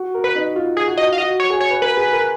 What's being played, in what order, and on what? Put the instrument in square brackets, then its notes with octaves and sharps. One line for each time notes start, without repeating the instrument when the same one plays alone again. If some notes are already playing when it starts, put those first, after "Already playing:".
Already playing: [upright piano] F#4
A#4
[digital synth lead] B4
[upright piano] D#4
F4
[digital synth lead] G#4
[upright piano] F#4
[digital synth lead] D#5
F5
[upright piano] F#4 [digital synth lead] D#5
[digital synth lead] C#5
[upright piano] G#4
[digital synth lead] C#5
[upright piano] B4
[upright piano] A#4 [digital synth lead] B4
[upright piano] G#4
A#4